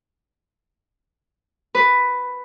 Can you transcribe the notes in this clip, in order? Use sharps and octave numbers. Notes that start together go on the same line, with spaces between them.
B4